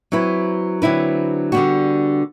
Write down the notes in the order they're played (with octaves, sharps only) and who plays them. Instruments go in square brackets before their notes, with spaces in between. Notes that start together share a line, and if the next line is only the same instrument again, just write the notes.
[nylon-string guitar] F#3 C4 E4 B4
D3 F#3 C4 E4 B4
D3 G3 B3 F#4